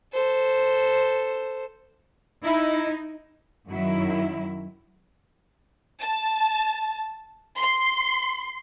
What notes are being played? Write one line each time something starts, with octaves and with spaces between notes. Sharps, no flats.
A4 C5
D#4 E4
F#2 D#3 F#3 E4
A5
C6